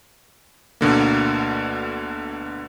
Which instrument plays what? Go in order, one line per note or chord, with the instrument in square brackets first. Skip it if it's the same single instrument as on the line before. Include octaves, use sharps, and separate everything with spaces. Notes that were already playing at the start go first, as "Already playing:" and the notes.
[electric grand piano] D2 B2 D3 A#3